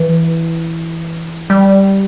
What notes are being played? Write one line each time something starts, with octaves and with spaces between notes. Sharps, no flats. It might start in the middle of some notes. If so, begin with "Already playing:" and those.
Already playing: E3
G3